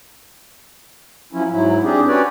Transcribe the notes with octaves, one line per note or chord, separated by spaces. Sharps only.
F3 F#3 C#4 E4
G#2 F#3 E4
C4 D4 G4 G#4
C#4 F#4 G4 B4 C#5 D5